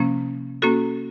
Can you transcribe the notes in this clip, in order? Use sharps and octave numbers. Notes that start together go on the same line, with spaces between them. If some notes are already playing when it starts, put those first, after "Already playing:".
Already playing: C3 F3 A#3 C#4
A#3 C#4 F#4 A4